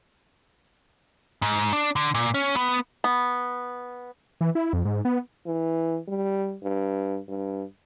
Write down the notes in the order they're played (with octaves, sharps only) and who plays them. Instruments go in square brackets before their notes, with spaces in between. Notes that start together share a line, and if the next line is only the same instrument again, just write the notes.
[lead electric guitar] G#2
D4
D3
A#2
C#4
B3
[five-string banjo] B3
[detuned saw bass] E3
E4
F2
G#2
B3
[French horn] E3
G3
G2
G2